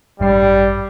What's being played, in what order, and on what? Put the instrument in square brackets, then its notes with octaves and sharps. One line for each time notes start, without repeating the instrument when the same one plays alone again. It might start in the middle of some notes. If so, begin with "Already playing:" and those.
[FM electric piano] A1 G2 C7 [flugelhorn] G3